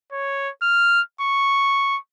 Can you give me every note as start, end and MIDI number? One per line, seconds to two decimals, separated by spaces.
0.12 0.50 73
0.63 1.01 89
1.21 1.98 85